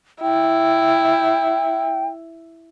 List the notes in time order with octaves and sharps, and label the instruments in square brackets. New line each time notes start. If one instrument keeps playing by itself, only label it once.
[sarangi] E4 [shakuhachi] G5